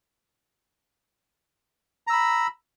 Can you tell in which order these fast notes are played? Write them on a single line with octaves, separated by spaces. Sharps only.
A#5 E6 B5